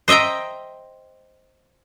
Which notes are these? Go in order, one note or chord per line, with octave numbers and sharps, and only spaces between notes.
C5 D#5 E5 G5 A#5